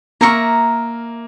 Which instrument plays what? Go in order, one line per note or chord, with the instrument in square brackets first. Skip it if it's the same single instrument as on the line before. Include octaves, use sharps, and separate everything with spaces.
[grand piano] A#3 [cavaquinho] A#4 E5 A#5 C#6